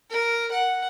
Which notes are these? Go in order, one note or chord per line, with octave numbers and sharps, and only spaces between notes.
A#4
F#5